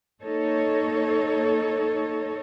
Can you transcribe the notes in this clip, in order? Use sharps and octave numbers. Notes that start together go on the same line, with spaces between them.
A#3 D#4 A4 C#5